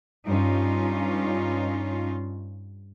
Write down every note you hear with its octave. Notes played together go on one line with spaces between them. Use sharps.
G2 C#4 D#4 F4